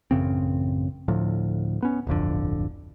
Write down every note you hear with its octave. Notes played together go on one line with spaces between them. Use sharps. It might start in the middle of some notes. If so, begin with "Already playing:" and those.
A1 F#2 C#3 C4
D2 A2 F3
B3 C#4
D1 G1 F2 D3